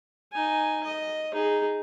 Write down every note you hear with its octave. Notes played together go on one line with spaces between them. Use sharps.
D#4 G#5
D#5
D#4 G#4